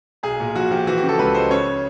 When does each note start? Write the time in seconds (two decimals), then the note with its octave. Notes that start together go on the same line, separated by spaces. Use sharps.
0.23 B1 G#4
0.40 A#2
0.55 F3 F#4
0.71 F3 G4
0.87 E3 F#4
0.97 G4
1.03 C#3
1.09 A4
1.19 C#2 B4
1.34 G#3 C5
1.51 C#3 C#5